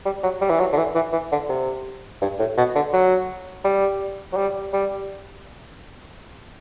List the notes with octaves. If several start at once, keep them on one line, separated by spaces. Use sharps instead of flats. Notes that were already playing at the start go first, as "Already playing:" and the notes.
G3
F#3
G3
E3
F#3
D3
E3
E3
E3
D3
C3
G2
A2
B2
D3
F#3
G3
F#3
G3
G3